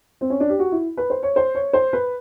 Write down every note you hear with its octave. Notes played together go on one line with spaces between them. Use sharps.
C4
C#4
D4
G4
F#4
E4
B4
C5
C#5
C5
C#5
C5
B4